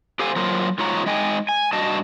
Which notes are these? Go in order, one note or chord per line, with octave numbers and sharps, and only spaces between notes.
G4 A4 C5 F5 G#5
F#3 A#3 F4 A#4 C5
G#2 F4 C#5 A#5
G#3 D#4 D#5 G5 G#5
G#5
G2 F#4 D#5 A5